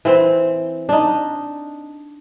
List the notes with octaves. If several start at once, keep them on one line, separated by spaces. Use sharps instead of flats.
E3 C4
D4 D#4